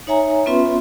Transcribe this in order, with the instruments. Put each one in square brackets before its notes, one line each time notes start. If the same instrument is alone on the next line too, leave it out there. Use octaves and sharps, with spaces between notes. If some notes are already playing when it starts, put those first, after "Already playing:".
[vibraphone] D#4 C#5 E5 G#5 A#5
B3 C#4 F4 B4 E5 C6